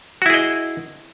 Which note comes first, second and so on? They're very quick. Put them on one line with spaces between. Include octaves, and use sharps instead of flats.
F#4 E4 G#4 D#5